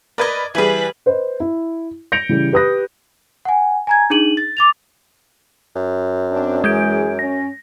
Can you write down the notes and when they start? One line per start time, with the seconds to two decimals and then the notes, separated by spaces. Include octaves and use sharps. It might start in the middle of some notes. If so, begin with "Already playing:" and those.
0.18 A#4 B4 D5 D#5 G#6
0.55 E3 G3 G#4 B4 G#5 B5
1.06 B4 C5 D#5
1.40 E4
2.12 G6 A#6 C#7 D7 F7
2.29 C#3 E3 G3
2.53 G4 B4 B5 D#6 F#6 A#6
3.45 F#5 G#5
3.87 G#5 A#5 G#6
4.10 D4 D#4 G#4 D#7 F#7
4.37 A6
4.57 D6 A6 F7
5.76 F#2
6.32 C4 D4
6.64 E3 G#3 G#4 G6 D7
7.19 C#4 A#6